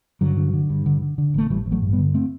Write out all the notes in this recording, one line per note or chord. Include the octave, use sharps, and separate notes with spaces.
G2 D3 F#3
D3
D3
G2
D3
D3
D3
A1 A3
A1 E3 G3
A1
F#3 A3
G2
G3 B3
D3
A3 C4